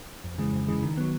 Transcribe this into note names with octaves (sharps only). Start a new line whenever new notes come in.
F2
C#3 E3 G#3
F2
C#3 E3 G#3
D#3
F#3 B3